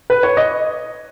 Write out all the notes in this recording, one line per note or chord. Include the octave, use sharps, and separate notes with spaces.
B4
C#5
D#5